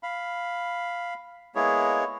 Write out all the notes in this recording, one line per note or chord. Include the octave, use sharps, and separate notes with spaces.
F5 B5
G#3 A#3 B3 E4 G#4 C#5